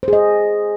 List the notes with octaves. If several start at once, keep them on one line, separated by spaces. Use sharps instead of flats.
G#4 C5 D#5